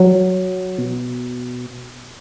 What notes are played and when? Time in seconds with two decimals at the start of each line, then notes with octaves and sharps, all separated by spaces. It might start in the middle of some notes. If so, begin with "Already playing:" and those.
Already playing: F#3
0.78 B2